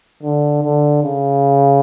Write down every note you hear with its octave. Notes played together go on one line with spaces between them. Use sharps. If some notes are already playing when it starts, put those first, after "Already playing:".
D3
D3
C#3